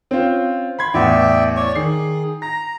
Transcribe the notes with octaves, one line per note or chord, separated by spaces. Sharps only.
C4 C#4 F4
B5 C6 G#6
A1 E2 D5 E5 G5
C#5 D5 C#6
D#3 G#4 C7
A#5 A#6